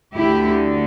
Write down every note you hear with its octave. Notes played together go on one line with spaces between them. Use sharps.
D2 D3 E4 G4